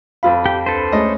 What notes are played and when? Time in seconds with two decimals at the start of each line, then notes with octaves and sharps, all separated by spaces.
0.23 F2 F4 F5 B5
0.46 G4 G5
0.66 D2 A4 B4 C5
0.92 G#3 A3 C#4 D#5